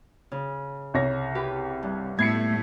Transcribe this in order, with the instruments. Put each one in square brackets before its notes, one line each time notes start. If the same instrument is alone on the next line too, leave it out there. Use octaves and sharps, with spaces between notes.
[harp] C#3
[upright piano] C2 C#5 A#6
[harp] G4 B4
G2
[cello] A2 A3 [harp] B3 [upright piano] G#6 C7 C#7